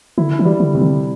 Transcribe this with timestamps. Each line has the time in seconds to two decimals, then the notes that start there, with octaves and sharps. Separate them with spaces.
0.18 D3 E4
0.39 E3
0.45 G3
0.60 D3
0.75 C3
0.82 D3